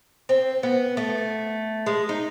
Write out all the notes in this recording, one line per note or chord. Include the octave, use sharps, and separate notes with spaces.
C4
B3
A3
G#3
D#4